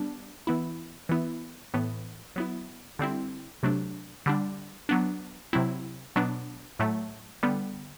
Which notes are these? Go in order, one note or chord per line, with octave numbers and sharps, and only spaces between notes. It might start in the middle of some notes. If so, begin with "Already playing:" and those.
Already playing: G3 B3 D4
E3 B3 E4
E3 B3 E4
A2 E3 B3
F#3 B3 E4
D3 G3 C4 E4
C3 F#3 A3 D4
D3 G3 D4
F#3 B3 D4
C3 F#3 C4 E4
B2 F#3 B3 D4
A2 F#3 A3
D3 G3 B3